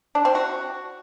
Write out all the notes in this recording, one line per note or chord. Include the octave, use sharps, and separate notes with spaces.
D4
C4
F#4